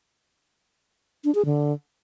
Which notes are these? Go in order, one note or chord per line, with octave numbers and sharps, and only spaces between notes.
D4
G#4
D3